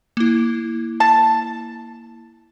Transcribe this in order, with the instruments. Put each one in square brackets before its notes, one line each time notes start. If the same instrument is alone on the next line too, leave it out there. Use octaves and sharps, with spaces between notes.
[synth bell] A#3 E4
[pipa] A5